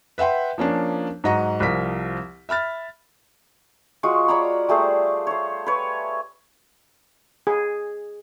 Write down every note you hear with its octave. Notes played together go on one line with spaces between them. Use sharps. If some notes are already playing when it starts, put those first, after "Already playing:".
B4 E5 F#5 G5 C6
F3 A#3 C#4 D4
G#2 F#3 D#5 F#5 A#5 C#6
C2 F3 A#4 B6
E5 B5 F6 A6
G#3 F4 F#4 C#6
C#5 D5 A#5 B5
G3 A3 G#4 C5
C5 C#5
B4 C#5
G#4